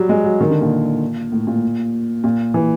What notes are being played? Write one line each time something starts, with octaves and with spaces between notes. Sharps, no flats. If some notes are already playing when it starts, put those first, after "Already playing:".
Already playing: F#3 G3
G#3
F#3
D#3
D3
A#2
A2
A#2
A#2
E3